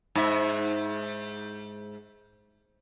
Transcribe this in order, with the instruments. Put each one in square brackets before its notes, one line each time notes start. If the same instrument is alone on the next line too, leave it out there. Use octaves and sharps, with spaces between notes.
[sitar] G#2 E5